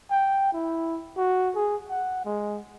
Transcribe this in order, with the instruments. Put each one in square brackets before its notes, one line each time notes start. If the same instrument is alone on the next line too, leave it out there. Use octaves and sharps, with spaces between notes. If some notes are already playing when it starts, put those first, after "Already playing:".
[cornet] G5
E4
F#4
G#4
F#5
G#3